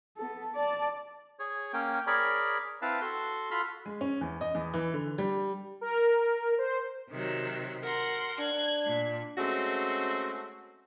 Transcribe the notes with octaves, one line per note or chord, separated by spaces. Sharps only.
B3 A4
D5 A5
G#4 C#5
A#3 C#4 G5
G#4 A#4 C#5 D5 B5
C4 E4 B4 F5 A5
F#4 A4 C6
F4 F#4 A4 B5 C6 F6
G#3
C#4
E2
D#5
E2
E3
D3
G3
A#4
C5
C3 D#3 F#3
A#4 F#5 C6
D4 F#6 G#6
A#2
G#3 A3 C4 C#4 F#4